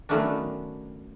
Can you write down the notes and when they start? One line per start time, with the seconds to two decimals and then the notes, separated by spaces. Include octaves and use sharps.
0.09 D#3 F#3 A3 B3 C#4 D4